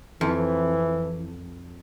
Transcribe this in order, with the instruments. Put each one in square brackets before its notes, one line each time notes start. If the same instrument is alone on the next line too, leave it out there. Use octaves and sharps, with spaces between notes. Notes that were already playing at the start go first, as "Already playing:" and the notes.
[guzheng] F2 [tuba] E3